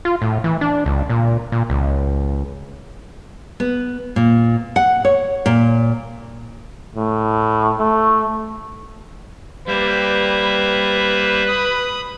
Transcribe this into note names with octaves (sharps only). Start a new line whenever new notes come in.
F4
A2
E3
D4
C#2
A#2
A#2
C#2
B3
A#2
F#5
C#5
A#2
A2
A3
G3 A#3 B4 C5 E5
B5 D#6